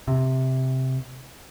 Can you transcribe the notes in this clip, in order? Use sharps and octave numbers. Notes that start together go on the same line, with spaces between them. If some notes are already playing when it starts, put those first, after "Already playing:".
C3